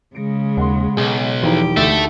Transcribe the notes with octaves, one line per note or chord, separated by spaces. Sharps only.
C#3 G#3 A#6 C#7 D7
D#2 F#5 C6
B1 G#4
E1 F3 D#4 G4 D#7
D2 A3 A4 E5 D#6 G6